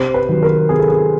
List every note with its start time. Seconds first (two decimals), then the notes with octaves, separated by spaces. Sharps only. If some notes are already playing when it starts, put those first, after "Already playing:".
Already playing: C3 C5
0.14 B4
0.29 D#3 F#3
0.43 A#4
0.69 C3 G#4
0.79 A4
0.89 G#4